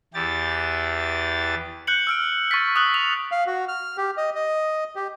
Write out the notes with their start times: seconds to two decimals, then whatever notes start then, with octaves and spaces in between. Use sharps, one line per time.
0.14 E2 E3 G4 A6
1.87 F#6 G6 C#7 F#7
2.07 E6 F6 D7
2.51 C#6 A6 B6
2.76 D#6 E6 F#6 F#7
2.94 F7
3.32 F5
3.47 F#4
3.68 F6
3.97 G4
4.17 D#5
4.35 D#5
4.96 G4